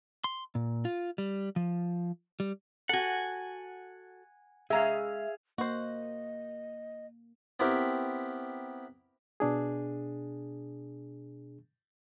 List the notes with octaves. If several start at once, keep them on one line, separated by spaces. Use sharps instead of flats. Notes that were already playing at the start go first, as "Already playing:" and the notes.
C6
A#2
F4
G3
F3
G3
F#4 A4 F#5 G#5
G#3 G#4 E5 F5 A#5
A#3 F#4 C5 D#5
B3 C4 E4 G4 A#4
B2 D4 G#4